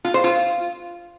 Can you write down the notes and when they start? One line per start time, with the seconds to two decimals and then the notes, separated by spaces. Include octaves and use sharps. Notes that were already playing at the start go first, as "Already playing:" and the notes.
0.05 F4
0.14 C5
0.24 F4